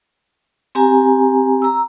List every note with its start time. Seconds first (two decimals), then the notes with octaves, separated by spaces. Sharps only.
0.75 C4 G4 G#5 A#5
1.62 A#5 E6